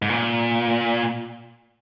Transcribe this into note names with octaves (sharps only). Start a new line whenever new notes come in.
G#2
A#2